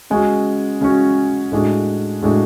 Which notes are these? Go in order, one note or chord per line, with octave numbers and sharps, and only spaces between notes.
C#3 G#3 C#4 F#4
C#3 G#3 C#4 F#4
A2 G#3 D4 F#4
A2 G#3 D4 F#4